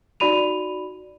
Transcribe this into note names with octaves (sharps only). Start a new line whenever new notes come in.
D#4 F#4 D5 B5 D#7 F7